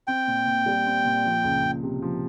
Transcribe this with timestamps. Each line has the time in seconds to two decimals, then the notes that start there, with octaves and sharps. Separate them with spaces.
0.07 C4 G5
0.28 A#2
0.46 A#2
0.66 G3
0.86 C4
1.05 A#2
1.25 F3
1.44 C#2
1.63 C#2
1.83 C3
2.02 F3